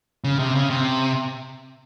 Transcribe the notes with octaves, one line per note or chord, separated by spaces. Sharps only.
C#3
C3
C#3
C3